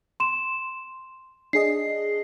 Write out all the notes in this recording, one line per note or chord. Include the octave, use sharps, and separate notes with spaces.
C6 E7
D4 G#4 D#5 C7